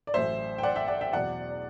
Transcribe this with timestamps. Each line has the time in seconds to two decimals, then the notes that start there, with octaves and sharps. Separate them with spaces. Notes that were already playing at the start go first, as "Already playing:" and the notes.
0.07 D5
0.14 A1 A2 F#3 C5 E5
0.58 G5
0.63 D5 F#5
0.76 E5 G5
0.88 D5 F#5
1.01 E5 G5
1.13 E2 B2 F#3 D5 F#5